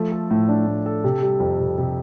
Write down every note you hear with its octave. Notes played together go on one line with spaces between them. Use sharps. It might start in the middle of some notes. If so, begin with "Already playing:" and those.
Already playing: F3 A3
A4
A2
D4
A2
A4
C3
G3
F2
C3
C3